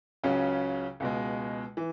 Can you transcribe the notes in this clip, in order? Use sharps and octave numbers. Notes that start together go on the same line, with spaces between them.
C#2 C#3 F#3 C#4
C#2 B2 G#3
E3